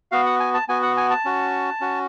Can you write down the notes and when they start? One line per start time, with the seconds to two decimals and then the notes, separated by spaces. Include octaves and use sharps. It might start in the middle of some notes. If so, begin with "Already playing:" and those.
0.11 B3 F#4 F5
0.26 F#5
0.40 G#5
0.54 A5
0.69 B3 F#4 G#5
0.83 F#5
0.97 G#5
1.10 A5
1.25 C#4 F#4
1.81 C#4 F#4